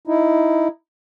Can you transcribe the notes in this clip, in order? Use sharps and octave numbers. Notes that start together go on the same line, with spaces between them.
D#4 E4